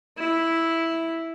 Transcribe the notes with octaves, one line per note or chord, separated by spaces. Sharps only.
E4